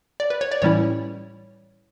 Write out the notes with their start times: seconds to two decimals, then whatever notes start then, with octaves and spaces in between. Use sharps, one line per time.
0.20 D5
0.30 B4
0.41 C#5
0.52 D5
0.62 A2 E3 G3 C#4 E4 C#5